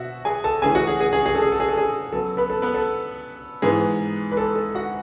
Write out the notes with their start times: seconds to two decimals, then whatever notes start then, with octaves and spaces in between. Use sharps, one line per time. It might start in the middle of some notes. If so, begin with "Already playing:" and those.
Already playing: B2 F#4 E5 F#5
0.25 G#4 G#5
0.44 A4 A5
0.62 C#3 E3 A3 C#4 G#4 G#5
0.75 F#4 F#5
0.87 G#4
1.00 G#4
1.13 G#4
1.26 G#4
1.34 A4
1.42 G#4
1.52 A4
1.60 G#4
1.68 A4
1.77 G#4
2.12 C#3 F#3 B3 A4
2.37 B3 B4
2.50 A4
2.62 B3 B4
2.74 A4
3.62 G#2 E3 B3 G#4
4.31 B4
4.37 A4
4.56 A4
4.75 F#4 F#5